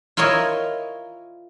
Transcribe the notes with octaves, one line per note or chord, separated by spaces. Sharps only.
E4 F4 A#4 C#5 D#5